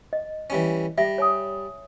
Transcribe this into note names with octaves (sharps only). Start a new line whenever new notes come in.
D#5
E3 G3 C#4
G3 E5
C#5 G#5 D#6